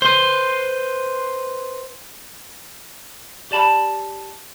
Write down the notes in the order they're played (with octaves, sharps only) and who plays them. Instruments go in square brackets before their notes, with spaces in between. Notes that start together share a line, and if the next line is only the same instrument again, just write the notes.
[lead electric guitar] B4 C5
[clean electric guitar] G4 D5 A5 B5